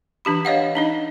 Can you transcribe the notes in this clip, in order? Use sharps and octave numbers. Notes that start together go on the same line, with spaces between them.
E3 D4 G4 B5
C#5 D#5 F5 F#5
D4 D#4 D#5